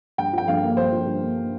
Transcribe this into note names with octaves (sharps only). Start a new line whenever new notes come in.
G2 G5
F3 G5
G2 F5
A#3
G2 C5
F3
G2
A#3